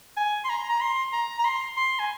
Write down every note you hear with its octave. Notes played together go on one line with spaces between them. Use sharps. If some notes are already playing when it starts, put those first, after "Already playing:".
G#5
C6
A#5
A#5
C6
A#5
A#5
C6
C6
G#5